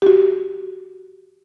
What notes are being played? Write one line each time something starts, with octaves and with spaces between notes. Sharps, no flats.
F#4 G4